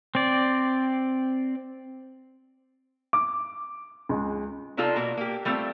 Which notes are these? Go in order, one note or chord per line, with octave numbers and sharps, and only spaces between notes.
C4 D5
D6
C#2 G#3
C3 D4 D#4 F4 A4
B2 A#3 F#4
A#3 G4
G3 A3 C4 F4